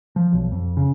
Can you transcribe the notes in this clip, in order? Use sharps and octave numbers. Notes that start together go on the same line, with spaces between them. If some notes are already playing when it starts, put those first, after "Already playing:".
F3
B1
F2
C#3